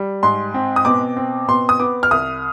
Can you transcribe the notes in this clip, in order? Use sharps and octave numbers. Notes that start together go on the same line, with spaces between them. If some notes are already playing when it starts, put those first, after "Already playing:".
Already playing: G3
G#2 C6
C4
D#6
B2 D6
C4
B2 C6
D#6
B3 D6
F6
C2 D#6